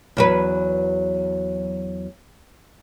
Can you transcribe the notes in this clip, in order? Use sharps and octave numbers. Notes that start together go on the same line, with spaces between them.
E2 F#3 B4